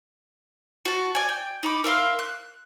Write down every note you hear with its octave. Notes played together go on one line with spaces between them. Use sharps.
F#4 A5
D5 G#5
G5
D#4 B5 D6
A#4 E5 F5 C6
F#6